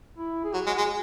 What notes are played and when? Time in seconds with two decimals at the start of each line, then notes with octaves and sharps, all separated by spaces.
0.18 E4
0.44 G#4
0.54 F#3 F#4
0.66 G#3 F#4
0.78 G#3 G#4